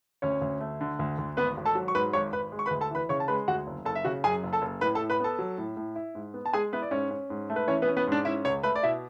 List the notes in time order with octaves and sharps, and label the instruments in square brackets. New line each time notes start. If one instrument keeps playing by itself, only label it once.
[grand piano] D2 C#4 C#5
D2
A3
D3
D2
D2
G#1 B3 B4
G#1
A4 A5
F#3
C#6
G#2 B4 B5
G#1 C#5 C#6
G#1 B4 B5
G#3
C#6
B4 B5
D2
A4 A5
E3 B4 B5
C#3 C#5 C#6
A5
G#3 B4 B5
D2 F#4 F#5
F#1
F#1 A4 A5
E5
C#3 F#4 F#5
F#2 G#4 G#5
F#1
A4 A5
F#1
A2 B4 B5
A4 A5
A2
B4 B5
B3 A4 A5
F#3
A2
A2
E4
G#2
B3
A5
G#3 G#4 G#5
B3 E4 B4
D5
G#2 C#4 C#5
C#4
G#2
A3
B4
E3 C#4 C#5
B3 B4
C#4
B3 B4
G#2 D4 D5
C#4 E4 E5
C#2 C#5 C#6
A3 B4 B5
D5
B2 E4 E5